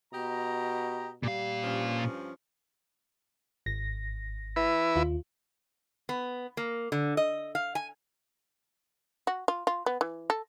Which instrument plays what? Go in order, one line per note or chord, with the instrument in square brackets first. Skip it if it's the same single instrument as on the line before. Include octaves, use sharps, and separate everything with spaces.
[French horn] B2 [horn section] G4 D#5 A#5
[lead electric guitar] A#2 F5 [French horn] G3
[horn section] G2 F3 C#4
[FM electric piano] G#1 A#6
[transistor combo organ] E4 B4
[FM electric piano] D#2 F4
[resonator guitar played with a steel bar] B3
A#3
D3
D#5
F5
G#5
[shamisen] F#4
F4
F4
B3
E3
A4